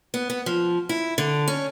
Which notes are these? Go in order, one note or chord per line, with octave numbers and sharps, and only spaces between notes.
B3
B3
F3
E4
D3
C#4